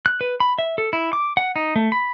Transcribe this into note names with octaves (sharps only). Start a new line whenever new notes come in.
F#6
B4
B5
E5
A4
E4
D6
F#5
D#4
A3
B5